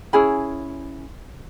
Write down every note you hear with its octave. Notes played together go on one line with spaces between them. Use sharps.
C#4 E4 G#4 B5